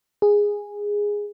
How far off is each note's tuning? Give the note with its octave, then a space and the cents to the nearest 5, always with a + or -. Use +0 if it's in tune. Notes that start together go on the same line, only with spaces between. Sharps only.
G#4 -10